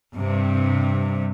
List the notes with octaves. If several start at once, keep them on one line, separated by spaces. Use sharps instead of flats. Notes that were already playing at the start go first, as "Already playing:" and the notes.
G2 C3